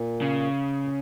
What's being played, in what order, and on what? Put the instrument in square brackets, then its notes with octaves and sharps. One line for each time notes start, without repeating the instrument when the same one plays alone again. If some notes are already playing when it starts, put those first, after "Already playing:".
Already playing: [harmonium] A#2
[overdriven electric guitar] C#3
[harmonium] A#2